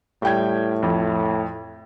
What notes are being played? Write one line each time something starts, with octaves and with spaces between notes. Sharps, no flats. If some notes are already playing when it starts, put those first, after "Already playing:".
A2 G3 G5 G#6
F2